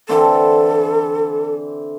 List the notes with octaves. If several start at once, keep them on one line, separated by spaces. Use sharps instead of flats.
D3 E3 C4 A4